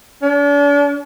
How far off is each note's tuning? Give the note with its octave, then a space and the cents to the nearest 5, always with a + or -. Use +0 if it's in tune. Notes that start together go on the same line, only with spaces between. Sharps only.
D4 -40